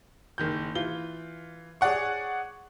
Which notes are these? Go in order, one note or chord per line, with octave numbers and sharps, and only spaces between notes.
F#1 D#3 G6
E3 F4 G7
G#4 C#5 D5 F#5 C#6